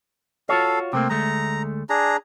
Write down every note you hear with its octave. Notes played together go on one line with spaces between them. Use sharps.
F4 F#4 A4 C#5 F5
C3 A3 A#3 C4
D2 G#3 A3 A#5
D4 G#4 A#5